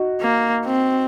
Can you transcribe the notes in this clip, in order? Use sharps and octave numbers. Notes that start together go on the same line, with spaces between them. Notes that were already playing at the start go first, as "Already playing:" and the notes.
Already playing: D#4 F#4
A#3
C4